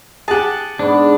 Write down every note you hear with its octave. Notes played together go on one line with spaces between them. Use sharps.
G4 G#4 F#5 A5
G#2 B3 D4